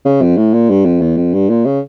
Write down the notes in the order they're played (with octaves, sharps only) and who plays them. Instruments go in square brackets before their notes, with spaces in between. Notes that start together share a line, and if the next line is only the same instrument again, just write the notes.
[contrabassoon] C#3
F2
A2
A#2
G2
F2
E2
F2
G2
A#2
C#3